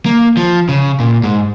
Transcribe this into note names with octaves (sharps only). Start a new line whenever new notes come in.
A#3
F3
C#3
A#2
G#2